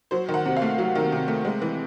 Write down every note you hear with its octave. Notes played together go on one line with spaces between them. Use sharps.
F#3 C5
D#3
F#5
C3
F5
A3
F#3
D#3
C3
A3
G#3
E3